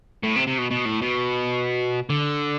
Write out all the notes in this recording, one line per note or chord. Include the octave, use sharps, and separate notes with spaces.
A2
C3
C3
B2
B2
A2
B2
D3